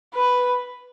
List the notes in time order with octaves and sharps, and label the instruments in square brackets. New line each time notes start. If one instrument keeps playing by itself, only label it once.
[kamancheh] B4